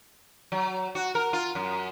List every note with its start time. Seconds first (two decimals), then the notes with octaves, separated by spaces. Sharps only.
0.52 F#3
0.95 F#4
1.15 A#4
1.33 F4
1.55 F#2